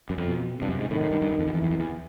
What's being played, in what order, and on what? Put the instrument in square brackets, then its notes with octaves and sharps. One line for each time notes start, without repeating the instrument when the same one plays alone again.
[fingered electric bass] F#2
F2
[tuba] B2
[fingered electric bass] G2 [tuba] C3
[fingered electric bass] F#2
G#2
[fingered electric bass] A2 [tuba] D#3
[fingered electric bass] A2
G2
G2
F#2
F2
E2
[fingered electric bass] F2 [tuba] E3
[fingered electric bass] E2
F2
E2